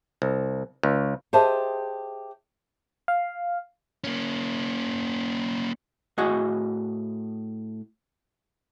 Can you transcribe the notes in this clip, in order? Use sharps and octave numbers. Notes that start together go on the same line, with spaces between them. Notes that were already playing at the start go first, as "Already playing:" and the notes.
C2
C#2
G4 G#4 C5 D#5 E5 A5
F5
A#3 C#4
A2 F#4 G#4 D#5 G#5